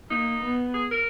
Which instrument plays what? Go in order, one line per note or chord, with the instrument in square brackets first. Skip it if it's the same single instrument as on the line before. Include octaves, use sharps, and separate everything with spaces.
[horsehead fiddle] A#3 [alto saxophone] D#4
[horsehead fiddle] B3
[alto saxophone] G#4
A#4